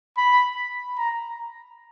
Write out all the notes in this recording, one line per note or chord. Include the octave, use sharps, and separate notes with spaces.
B5
A#5